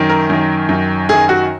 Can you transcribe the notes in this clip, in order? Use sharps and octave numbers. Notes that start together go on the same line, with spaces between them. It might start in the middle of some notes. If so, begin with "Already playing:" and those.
Already playing: F#2 D#3
A#4
F#2 D#3
F#2 D#3
F#2 D#3 G#4
F#4